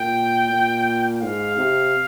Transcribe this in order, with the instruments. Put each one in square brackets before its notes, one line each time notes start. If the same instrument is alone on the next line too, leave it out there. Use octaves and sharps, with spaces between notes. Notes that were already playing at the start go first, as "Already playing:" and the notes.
Already playing: [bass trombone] A#2 [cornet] G5
[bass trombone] A#2
[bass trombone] G#2 [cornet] F5
[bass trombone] C3